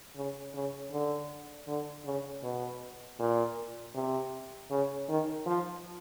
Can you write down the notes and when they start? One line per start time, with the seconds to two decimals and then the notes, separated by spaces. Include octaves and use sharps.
0.16 C#3
0.54 C#3
0.92 D3
1.68 D3
2.05 C#3
2.43 B2
3.19 A#2
3.95 C3
4.70 C#3
5.08 D#3
5.46 F3